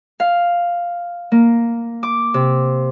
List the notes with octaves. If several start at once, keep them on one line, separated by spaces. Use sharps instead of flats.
F5
A#3
D6
C3